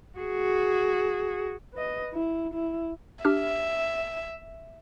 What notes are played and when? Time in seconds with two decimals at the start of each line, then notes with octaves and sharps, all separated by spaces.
0.18 F#4 G#4
1.74 B4 D#5
2.13 E4
2.54 E4
3.25 D4 G4 E5 F6